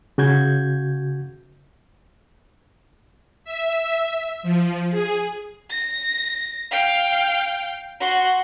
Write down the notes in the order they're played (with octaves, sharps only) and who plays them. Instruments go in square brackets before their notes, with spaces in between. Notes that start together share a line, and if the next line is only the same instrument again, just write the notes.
[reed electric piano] C#3 F#4 G6 G#6
[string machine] E5
F3
G#4
[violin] A#6
F5 G5
F#4 C6